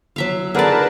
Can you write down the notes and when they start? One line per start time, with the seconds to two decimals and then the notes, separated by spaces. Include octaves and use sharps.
0.16 F#3 E5 F5
0.55 D3 G#4 A#4 B4 D5 A5